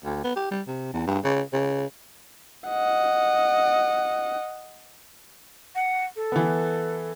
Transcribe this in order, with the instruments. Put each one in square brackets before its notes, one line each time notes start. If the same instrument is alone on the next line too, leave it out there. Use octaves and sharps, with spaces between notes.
[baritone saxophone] D2
B3
G4
G3
C3
E2
G2
C#3
C#3
[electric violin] D#5 F#5
[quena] F#5
A4
[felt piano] E3 B3